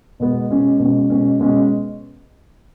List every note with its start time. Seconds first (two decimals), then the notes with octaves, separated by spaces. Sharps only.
0.20 B2 G#3 B3
0.50 B2 G#3 C#4
0.79 B2 G#3 C#4
1.10 B2 G#3 C#4
1.40 B2 G#3 C#4